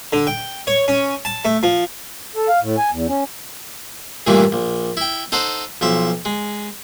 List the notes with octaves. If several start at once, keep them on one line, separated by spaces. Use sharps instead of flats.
D3
G5
C#5
C#4
A5
A3
F3
A4
F5
A2
G#5
E2
C#4
G2 A#2 D#3 E3 G3 A3
A#1
E4 G5
D#4 A4 C5 F#5
B1 F3 E5
G#3